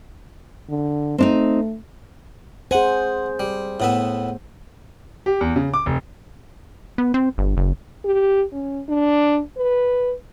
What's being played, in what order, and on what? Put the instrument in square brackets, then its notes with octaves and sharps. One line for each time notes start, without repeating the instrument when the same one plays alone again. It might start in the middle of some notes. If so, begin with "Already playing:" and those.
[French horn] D3
[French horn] A3 [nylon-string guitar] C4 D4 D#4
[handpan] G#4 C5 [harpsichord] F#5 G#5
[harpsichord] G3
A2 B3 E5
[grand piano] G4
E2
C#3
D6
F1
[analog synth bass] B3
C4
G1
F#1
[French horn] G4
C#4
D4
B4